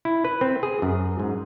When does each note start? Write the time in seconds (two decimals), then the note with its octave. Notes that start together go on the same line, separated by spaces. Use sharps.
0.05 E4
0.25 B4
0.41 C4
0.63 G#4
0.82 F#2
1.20 G#2